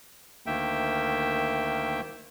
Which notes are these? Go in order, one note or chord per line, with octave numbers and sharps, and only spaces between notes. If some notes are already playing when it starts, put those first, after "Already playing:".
D2 D#3 A#3 E5 G5